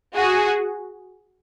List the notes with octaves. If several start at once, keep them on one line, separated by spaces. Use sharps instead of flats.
F#4 G#4